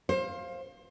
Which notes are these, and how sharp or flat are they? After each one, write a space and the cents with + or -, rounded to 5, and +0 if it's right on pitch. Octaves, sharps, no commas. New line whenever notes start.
C5 +30 F5 +0